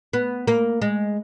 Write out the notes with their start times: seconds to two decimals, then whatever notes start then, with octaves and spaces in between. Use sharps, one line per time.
0.13 B3
0.47 A#3
0.82 G#3